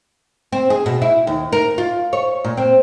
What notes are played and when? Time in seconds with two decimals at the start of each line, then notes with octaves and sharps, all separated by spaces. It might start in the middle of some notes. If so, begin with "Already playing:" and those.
0.52 C4
0.70 G#4
0.86 B2
1.02 E4
1.27 D#2
1.53 A#4
1.78 F4
2.13 C#5
2.44 A#2
2.57 C4